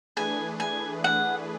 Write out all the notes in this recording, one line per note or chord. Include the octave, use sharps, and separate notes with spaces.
E3 A3 D4 G#4 B4 G#5
G#5
F#5